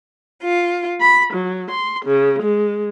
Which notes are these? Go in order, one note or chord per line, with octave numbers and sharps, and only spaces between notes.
F4
B5
F#3
C6
C#3
G#3